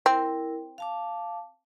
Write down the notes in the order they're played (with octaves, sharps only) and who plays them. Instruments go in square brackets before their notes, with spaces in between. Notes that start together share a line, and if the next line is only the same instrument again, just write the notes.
[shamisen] C4 [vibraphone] E4 A#4
[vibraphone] F5 A5 D6